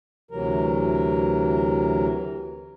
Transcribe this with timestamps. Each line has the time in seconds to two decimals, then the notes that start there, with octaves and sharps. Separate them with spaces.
0.31 D2 C3 E3 F#3 A#4